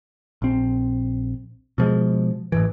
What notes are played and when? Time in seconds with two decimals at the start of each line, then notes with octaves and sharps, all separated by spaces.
0.42 A#1 C4
1.78 B2 F3 G#3
2.52 A1 G#2 E3